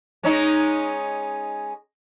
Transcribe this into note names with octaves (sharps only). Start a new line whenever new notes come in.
G#3 C#4 D#4